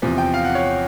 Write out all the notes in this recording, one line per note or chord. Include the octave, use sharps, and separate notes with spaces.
E2 C3 F3
G5
F5
F#5
C#5